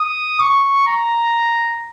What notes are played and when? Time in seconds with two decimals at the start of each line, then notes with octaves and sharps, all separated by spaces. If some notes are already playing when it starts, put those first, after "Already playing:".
Already playing: D#6
0.40 C#6
0.87 A#5